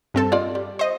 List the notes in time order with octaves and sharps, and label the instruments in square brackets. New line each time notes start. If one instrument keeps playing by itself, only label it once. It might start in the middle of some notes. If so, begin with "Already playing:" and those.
[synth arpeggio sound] G2 C4 A4
[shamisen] F4 D5 D#5
G3
[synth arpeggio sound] C5 D#5